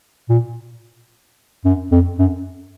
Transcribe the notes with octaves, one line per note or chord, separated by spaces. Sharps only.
A#2
F#2
F2
F#2